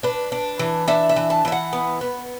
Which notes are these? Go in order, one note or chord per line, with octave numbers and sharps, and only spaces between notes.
D4 B4
D4
E3
D4 E5
E5
E3
A5
E3 E5
F#5
B3
B3